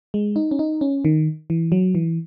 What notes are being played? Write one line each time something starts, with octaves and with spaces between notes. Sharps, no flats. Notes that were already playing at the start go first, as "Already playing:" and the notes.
G#3
D#4
C#4
D#4
C#4
D#3
E3
F#3
E3